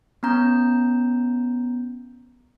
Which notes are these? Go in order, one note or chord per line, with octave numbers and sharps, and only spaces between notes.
B3 C#4 A#5 G6